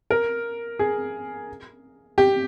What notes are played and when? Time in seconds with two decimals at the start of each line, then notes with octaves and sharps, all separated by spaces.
0.11 A#4
0.79 G#4
2.18 G4